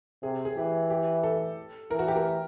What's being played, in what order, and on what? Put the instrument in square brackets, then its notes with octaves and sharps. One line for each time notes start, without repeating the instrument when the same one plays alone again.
[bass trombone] C3 [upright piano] G#4
[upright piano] G#4
[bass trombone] E3 [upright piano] G4
[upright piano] G4
A4
[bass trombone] E3 [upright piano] A#4
[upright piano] F#4
G4
A#4